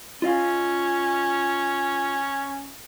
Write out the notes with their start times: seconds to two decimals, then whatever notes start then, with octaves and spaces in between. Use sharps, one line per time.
0.22 C#4 F4 D#5 F5